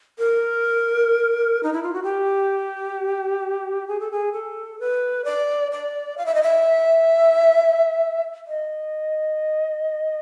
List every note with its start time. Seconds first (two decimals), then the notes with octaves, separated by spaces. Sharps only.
0.19 A#4
1.63 D#4
1.73 E4
1.83 F4
1.93 F#4
2.03 G4
3.88 G#4
4.00 A4
4.11 G#4
4.33 A4
4.80 B4
5.25 D5
5.72 D5
6.18 F5
6.26 E5
6.35 D#5
6.42 E5
8.47 D#5